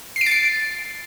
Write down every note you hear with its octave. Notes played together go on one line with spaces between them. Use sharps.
C7
D7
A6
C7